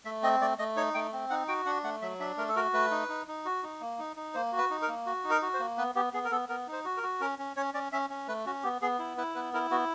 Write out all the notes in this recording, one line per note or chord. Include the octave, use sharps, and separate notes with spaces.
A3 E5
C4 D#5
A3 D5
A3 D#5
D#4 C#5
A3 G5
C4
D#4 F#5
F#4 G5
D4 F#5
A3 F#5
F#3 E5
D4 E5
A3 A#4
A4
F#4 A#4
A3 B4
D#4
D#4
D#4
F#4
D#4
A#3
D#4
D#4
A#3 C5
F#4
B4
D#4
A#4
A#3
F#4
D#4
A#4
F#4
C5
A#3
B3 B4
B3 G4
B3 G#4
A#4
B3 A4
B3 A#4
D#4
C5
F#4
A#4
F#4
C#4 A#4
C#4
C#4 C#5
C#4 D5
C#4 E5
C#4
A3 B4
C#4 F#4
B3 G4
B3 G#4
E4
E4 B4
B3 B4
E4 A#4
B3 F#4